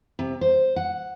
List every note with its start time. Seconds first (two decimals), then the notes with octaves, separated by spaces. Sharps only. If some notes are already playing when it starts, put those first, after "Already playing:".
0.19 C3
0.41 C5
0.76 F#5